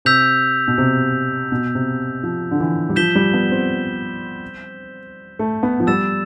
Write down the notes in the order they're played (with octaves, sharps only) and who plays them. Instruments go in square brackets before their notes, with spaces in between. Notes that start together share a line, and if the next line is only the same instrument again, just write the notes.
[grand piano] C3 [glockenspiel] E6 G6 B6 F7
[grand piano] B2
C3
B2
C3
F3
D3
E3
G3
[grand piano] F3 [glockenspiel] G6 B6 E7 G7
[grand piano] G3
B3
C4
A3
B3
F3
[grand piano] G3 [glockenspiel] E6 A6 E7